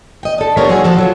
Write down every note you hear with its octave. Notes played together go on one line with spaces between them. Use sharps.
D#5 G5
D4 A4
B3 D4 F4 G4 A#4 C#5
F#3 G#3 F#4 G#4 C#5
F3 F#4 A4 B4
F#3 G3 F4